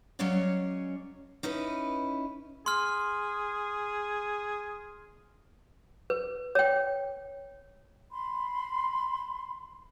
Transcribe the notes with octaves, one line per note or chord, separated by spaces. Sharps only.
F#3 G#3 C#4 C#5 D5 F5
C#4 D#4 E4 B4
G#4 C6 F6
B4
C#5 G5
B5 C6